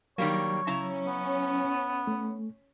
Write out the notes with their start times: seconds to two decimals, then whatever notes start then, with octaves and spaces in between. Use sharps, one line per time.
0.18 D#3 F#3 G3 A#3 C#5
0.67 C#3 C#4 E4 A#5
1.06 B3
2.07 A3